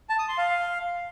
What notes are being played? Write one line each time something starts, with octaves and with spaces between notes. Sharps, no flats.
A5
D#6
C6
F5